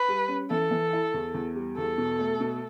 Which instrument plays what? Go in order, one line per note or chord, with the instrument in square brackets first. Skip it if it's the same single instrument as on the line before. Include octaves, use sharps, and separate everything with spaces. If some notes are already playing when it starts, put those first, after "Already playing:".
Already playing: [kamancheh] B4
[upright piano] G3
C#4
[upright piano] E3 [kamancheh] A4
[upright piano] E3
E4
E2
E2
G3
[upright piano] E2 [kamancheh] A4
[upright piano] B2
A3
B2